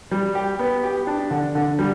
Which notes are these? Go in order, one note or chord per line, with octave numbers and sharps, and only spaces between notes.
G3
G4
B3
G4
D4
D3
D3
G3